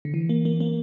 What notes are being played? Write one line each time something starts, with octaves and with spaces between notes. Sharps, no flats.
D3
E3
A#3
A#3
A#3